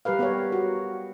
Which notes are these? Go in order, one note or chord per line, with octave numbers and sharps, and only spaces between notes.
G3 G4 A#4 B4 F5
B3 G4 A#4 C#5
F#4